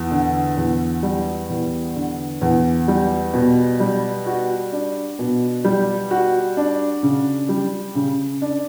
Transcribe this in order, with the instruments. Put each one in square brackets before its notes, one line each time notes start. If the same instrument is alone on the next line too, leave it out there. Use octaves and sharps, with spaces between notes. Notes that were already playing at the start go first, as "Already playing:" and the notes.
Already playing: [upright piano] E2
D3
E2
G3
E2
D3
E2
G3
B2
G3
F#4
D4
B2
G3
F#4
D4
C#3
G3
C#3
D4